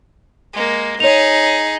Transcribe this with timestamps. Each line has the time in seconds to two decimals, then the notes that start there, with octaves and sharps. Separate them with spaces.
0.53 G#3 A#3
1.00 D#4 G#4 C#5 F7